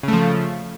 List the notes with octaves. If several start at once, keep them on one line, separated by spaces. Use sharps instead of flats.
C#3 F3 A3